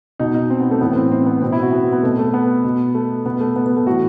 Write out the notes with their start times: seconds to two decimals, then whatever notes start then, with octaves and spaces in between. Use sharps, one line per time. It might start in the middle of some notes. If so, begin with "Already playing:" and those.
0.19 B2 D#4
0.34 D#4
0.50 C4
0.60 B3
0.71 A3
0.81 A2 E3 B3
0.96 C4
1.12 C4
1.26 B3
1.42 B2 C4
1.52 E4
1.62 F#4
1.73 B3
1.82 C4
1.93 B3
2.03 B2 A3
2.19 A3
2.34 B3
2.64 B2
2.95 A3
3.25 B2 B3
3.41 A3
3.56 B3
3.66 B3
3.77 A3
3.86 A2 E3 F#4